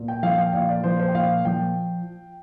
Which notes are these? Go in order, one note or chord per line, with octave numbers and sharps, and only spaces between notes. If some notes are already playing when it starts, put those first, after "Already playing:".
Already playing: A#2
G5
F3 F5
G5
A#2 F5
D5
F3 C5
C5
G5
A#2 F5
F3 G5